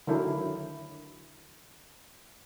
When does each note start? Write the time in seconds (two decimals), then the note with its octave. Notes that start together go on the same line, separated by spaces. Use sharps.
0.07 D3 D#3 F#3 E4 A4 A#4